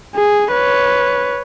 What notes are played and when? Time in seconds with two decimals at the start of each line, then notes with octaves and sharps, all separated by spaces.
0.15 G#4
0.52 B4 C#5